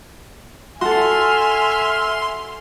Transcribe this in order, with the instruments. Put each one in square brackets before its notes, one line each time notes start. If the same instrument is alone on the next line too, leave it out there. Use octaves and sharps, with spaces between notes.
[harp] F#4 A4 [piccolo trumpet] E5 [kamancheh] G#5 F6 [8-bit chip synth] C6